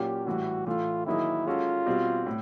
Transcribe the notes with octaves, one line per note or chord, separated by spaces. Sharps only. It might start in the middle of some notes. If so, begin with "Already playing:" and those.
Already playing: A#2 F#3 A#3 C#4 F4 G4
A2 E3 G3 F#4
A2 E3 A3 F4
D#3 F#3 A#3 D#4 E4 G#4
G#3 C#4 F4 F#4 A4
B2 G3 C4
A2